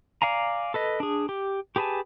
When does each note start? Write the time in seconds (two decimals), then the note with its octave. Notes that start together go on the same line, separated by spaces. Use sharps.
0.22 D5 F5 G#5 A#5
0.74 A4 B4 D#5
1.00 D4 G#4
1.29 G4
1.76 G4 G#4 B4 G#5 A5